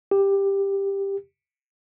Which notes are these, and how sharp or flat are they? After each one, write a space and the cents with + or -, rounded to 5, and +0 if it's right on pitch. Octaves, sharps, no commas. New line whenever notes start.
G4 +10